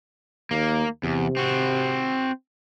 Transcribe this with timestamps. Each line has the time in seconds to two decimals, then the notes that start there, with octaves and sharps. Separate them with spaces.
0.51 D#2 A#3
1.03 E2 C3
1.37 C4 F#4